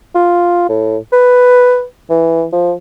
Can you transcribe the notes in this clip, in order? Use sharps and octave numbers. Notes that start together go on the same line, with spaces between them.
F4
A2
B4
E3
F3